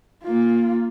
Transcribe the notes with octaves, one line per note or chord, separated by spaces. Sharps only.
A#3 F4